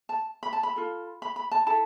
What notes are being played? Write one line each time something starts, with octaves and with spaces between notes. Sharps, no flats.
A5
B5
A5
B5
F4 A4
B5
B5
A5
E4 A4 A5